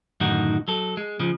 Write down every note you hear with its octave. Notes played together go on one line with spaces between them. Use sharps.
F#2 A2 D3 D#3 D#4 F#4
F#3 A4
G#3
C#3 F3 G#3